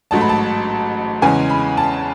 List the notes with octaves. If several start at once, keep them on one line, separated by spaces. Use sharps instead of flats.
A1 G#2 F#3 A3 A5
B5
A5
E2 C#3 E3 G#3 C#4 G#5
B5
A5